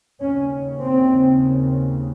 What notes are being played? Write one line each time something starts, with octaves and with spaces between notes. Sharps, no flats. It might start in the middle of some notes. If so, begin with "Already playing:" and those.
D#2 C#3 C#4
C4